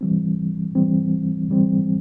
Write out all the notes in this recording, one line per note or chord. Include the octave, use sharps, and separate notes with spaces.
E3 G3 C4
E3 G3 C4
E3 G3 C4